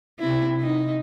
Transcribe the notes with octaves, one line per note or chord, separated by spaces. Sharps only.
C3 C4 E4
D#4